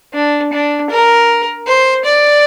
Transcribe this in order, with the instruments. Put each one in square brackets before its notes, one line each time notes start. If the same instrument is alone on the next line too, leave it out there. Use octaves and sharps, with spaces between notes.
[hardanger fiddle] D4
D4
A#4
C5
D5